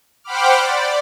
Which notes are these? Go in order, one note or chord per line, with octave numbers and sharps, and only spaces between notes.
C5 F#5 G5 B5 D6 F6
D5